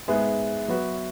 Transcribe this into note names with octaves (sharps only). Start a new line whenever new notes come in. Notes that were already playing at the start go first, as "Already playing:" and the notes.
G#2 G#3 B3 E5
F#3 B3 F#4 B4